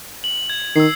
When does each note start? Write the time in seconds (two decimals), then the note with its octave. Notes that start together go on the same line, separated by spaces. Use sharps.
0.24 F#7
0.50 G#6
0.76 D#3 E6 C7